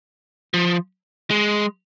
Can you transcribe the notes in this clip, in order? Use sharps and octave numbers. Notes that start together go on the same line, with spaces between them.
F3
G#3